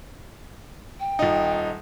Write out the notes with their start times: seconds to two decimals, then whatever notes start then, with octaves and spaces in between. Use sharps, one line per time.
1.00 G5
1.19 D#1 D#4